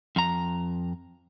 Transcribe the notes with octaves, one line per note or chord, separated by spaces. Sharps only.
F2 A#5